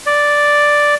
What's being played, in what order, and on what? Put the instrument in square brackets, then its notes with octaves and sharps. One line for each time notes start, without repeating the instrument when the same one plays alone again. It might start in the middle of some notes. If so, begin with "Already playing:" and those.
[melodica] D5